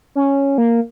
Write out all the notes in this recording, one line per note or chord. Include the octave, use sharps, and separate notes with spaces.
C#4
A#3